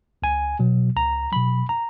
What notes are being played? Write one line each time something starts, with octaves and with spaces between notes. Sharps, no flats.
C#2 G#5
B2 F#3
C#2 A#5
B2 F#3 B5
A#5